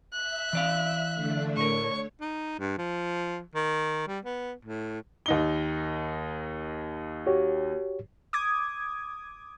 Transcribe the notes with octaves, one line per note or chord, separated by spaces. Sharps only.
E5 F#6
E3 D5 F5
D3 A3 D4
A2 A#4 C#5 C#6
D#4
G2
F3
D#3
G3
B3
A2
D#2 D#4 G7
F#4 G4 C#5
D6 D#6 G#6